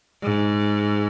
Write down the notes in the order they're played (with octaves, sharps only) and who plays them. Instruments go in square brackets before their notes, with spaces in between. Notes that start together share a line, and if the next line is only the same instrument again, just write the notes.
[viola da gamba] G#2